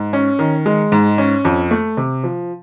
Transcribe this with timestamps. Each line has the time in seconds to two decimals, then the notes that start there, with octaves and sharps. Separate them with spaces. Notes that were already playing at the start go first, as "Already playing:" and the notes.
Already playing: G#2
0.13 C#4
0.39 D#3
0.66 G#3
0.92 G#2
1.18 C#4
1.45 F2
1.71 A3
1.97 C3
2.24 F3